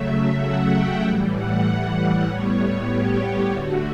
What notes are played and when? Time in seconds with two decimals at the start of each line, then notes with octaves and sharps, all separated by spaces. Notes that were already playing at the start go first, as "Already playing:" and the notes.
Already playing: C#3 F#3 A3 E5
0.40 F#5
0.70 G5
1.02 A2 E3 G3
1.34 F#5
2.26 A2 G3 B3 C#5
2.89 G4
3.19 G4
3.50 D3 A3 F#4